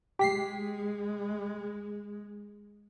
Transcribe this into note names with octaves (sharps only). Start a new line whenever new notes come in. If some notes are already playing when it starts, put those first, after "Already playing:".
G#3 G4 B6 C7